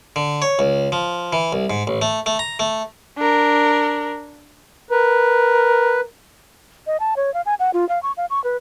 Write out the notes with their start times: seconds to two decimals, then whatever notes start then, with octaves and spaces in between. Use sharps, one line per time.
0.16 D3
0.42 C#5
0.59 C#2
0.92 F3
1.33 E3
1.53 C2
1.70 G#2
1.87 A1
2.02 A3
2.26 A3
2.39 A#5
2.59 A3
3.17 D4 A#4
4.91 A#4 B4
6.87 D#5
7.00 A5
7.16 C#5
7.34 F5
7.46 G#5
7.60 F#5
7.73 F4
7.89 F5
8.03 C#6
8.17 F5
8.30 C#6
8.44 B4